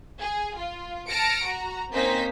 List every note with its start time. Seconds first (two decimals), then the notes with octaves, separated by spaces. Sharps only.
0.19 G#4
0.58 F4
1.08 A5 F6 A#6 C#7 D7
1.45 F#4 A#5
1.94 A#3 C4 C#4 D#4 C5 B6